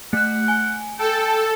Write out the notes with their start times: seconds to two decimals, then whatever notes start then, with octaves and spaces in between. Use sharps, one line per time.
0.13 A3 F#5 F#6
0.48 G#5
0.99 A4 G5